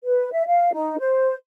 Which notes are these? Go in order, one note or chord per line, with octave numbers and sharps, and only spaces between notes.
B4
E5
F5
D#4
C5